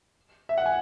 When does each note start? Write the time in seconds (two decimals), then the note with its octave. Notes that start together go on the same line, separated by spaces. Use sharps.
0.49 E5
0.58 F#5
0.66 G#5